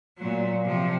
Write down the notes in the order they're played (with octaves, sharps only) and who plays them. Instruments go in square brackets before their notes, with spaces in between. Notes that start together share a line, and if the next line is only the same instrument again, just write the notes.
[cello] A#2 F#3
C3 F3